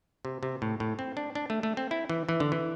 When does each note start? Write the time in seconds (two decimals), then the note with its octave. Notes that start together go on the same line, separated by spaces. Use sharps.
0.25 C3
0.43 C3
0.62 A2
0.80 A2
0.99 C4
1.17 D4
1.35 D4
1.50 A3
1.63 A3
1.77 C4
1.91 E4
2.09 E3
2.29 E3
2.40 D3
2.52 E3